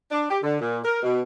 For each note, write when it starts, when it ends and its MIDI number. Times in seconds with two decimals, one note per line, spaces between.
0.11 0.24 62
0.30 0.38 67
0.43 0.56 50
0.61 0.79 46
0.84 0.98 70
1.03 1.20 47